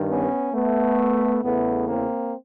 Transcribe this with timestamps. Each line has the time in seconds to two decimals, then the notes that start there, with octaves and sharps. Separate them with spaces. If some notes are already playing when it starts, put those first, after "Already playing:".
Already playing: G2 D#3
0.09 B3 C#4
0.54 A3 B3
1.43 E2 C#3 E3 A3 B3
1.88 A#3 C4